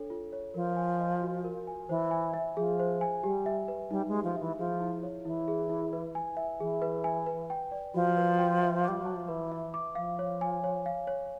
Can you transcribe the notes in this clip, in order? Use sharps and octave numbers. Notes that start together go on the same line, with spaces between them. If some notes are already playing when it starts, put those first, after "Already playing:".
Already playing: D4 A4 C#5
F4
C#5
F3 A#4
G#5
D#5
F#4
A#4
G#5
E3 C5
G#5
E5
F3 G#4
C5
G#5
G3 G4
E5
B4
G3 D#4
G#3
G4
F3
E3 E5
F3 G#4
E4
C#5
E3 E4
G#4
E4
B4
G#5
E5
E3 G#4
B4
G#5
B4
G5
D5
F3 F#4
B4
G5
E5
G3 D6
F#3 A5
F3
E3 B4
E5
D6
F3 F5
C#5
G#5
C#5
F5
C#5